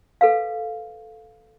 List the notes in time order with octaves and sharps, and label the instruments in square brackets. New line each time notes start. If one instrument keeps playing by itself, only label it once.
[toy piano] A4 B4 F5